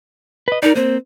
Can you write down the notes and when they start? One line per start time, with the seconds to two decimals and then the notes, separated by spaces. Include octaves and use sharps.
0.48 B4 D#5
0.63 D#4 A#4 D5
0.75 A#3 C4 C5